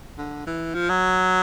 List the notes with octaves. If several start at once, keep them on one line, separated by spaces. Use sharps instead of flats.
D3
E3
F3
F#3